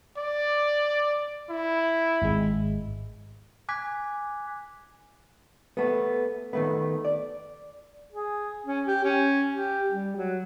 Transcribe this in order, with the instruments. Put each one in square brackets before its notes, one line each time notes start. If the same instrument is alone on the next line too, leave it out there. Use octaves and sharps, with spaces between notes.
[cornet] D5
E4
[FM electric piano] G#1 G#3
[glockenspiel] G#5 D6 F#6 G#6 B6
[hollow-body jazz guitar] A3 B3
D#3 A3 B3
D5
[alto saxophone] G#4
C#4
G4
C#4
G4
G3
F#3